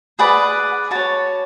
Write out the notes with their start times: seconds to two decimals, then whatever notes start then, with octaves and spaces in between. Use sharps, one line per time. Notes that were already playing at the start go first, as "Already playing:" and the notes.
0.19 G#4 B4 D5 F#5
0.91 F#4 C#5 A5